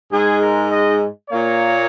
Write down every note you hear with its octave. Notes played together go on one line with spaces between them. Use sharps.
G#2 G#3 G#4
A#4
D#5
A#2 A#3 C#5